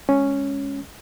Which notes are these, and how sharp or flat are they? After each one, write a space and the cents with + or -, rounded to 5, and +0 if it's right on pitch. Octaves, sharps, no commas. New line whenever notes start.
G#3 +0 C#4 +0